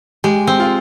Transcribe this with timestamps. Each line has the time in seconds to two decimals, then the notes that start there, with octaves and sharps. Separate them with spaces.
0.24 G#3 G4
0.47 C4
0.59 F4